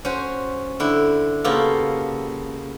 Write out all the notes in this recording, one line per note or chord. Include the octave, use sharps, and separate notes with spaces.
C#4 F#4 C5
D3 E4 G5
C#3 A#3 B3 F4 G4 A4